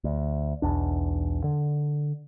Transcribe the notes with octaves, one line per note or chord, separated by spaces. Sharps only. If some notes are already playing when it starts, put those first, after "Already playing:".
D2
B1 E2 D4
D3